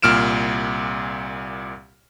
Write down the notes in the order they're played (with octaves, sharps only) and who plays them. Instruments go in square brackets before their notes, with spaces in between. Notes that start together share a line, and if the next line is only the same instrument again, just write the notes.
[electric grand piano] C2 A#2 F6 D7 E7